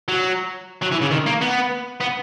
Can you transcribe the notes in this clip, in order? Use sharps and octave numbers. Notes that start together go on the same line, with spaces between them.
F#3
F#3
E3
C#3
D#3
A#3
B3
B3